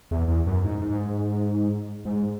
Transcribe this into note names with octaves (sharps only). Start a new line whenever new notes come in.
E2
E2
F#2
G#2
G#2
G#2